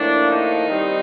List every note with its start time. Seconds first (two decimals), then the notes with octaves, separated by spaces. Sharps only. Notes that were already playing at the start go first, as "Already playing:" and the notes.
Already playing: A2 F3 A#3 D4
0.28 D#4
0.67 D#3 G3 C4